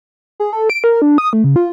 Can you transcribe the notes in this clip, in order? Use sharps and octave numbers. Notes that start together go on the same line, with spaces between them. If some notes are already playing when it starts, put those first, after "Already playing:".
G#4
A4
D7
A#4
D4
D#6
A3
C#3
F4